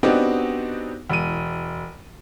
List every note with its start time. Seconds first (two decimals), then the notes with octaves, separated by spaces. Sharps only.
0.03 B3 C4 D4 D#4 F#4 G4
1.10 E1 D#7